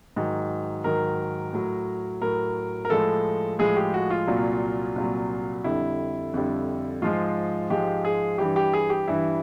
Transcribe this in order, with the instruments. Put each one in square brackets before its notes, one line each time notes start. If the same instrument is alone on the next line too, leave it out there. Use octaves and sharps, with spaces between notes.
[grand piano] G#2 D#3 F#3
G#2 D#3 F#3 A#4
A2 F#3
A2 F#3 A#4
A#4
A2 F3 G#3 A4
A2 F3 G#3 G#4
G4
F#4
F4
C2 A#2 F#3
C2 A#2 F#3
F2 D3 G3 E4
F2 D3 G3
G#2 F3 G#3 F4
G#2 F3 G#3 G4
G#4
G2 E3 G3 G4
G4
G#4
G4
G2 E3 G3 E4